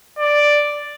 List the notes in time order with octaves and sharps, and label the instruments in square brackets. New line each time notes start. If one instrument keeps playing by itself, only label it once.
[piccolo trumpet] D5